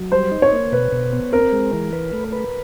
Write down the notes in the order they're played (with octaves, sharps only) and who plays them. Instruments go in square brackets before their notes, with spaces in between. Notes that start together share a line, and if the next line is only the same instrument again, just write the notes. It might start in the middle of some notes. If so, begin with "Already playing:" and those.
Already playing: [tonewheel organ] F#3
[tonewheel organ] G3 [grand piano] C5
[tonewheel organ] D#4
[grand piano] C#5
[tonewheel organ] A#3
[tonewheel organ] B2 [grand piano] B4
[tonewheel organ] B2
B3
[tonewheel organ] C4 [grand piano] A#4
[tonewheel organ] G#3
E3
B4
A3
B4